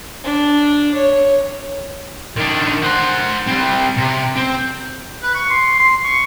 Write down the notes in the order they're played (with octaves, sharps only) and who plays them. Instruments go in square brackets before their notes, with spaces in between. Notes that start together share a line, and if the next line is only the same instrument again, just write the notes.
[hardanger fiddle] D4
C#5
[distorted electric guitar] D#3 D4
C5 F#5
G3 C4
C3
C4
[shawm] B4
C#6
C6
C6
C#6